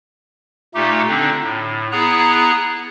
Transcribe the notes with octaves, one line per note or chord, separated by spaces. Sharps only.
A#2 A3 D#4 G4
D3 C4 D4 D#4
A2
B3 E4 G#4 A#5 F#6